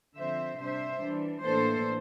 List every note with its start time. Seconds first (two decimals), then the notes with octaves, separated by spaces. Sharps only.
0.17 D3 F3 C4 C5 E5
0.60 C3 G3 D4 C5 E5
1.02 E3 G3 D4
1.44 A2 E3 A#3 D4 A4 C5